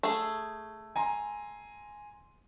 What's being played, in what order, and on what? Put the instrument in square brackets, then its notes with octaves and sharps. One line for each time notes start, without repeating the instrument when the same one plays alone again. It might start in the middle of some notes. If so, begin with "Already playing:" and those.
[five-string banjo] A3 G#4
[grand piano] G#5 A#5 C6